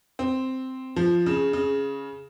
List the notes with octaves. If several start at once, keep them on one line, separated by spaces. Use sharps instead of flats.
C4
F3
C#3
C#3